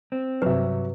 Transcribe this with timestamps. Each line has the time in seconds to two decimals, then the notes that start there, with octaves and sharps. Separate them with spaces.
0.12 C4
0.42 G2 C3 F#3 B4 E5